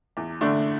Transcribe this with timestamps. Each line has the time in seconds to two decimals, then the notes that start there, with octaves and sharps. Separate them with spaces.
0.17 E2
0.41 D3 A3 D4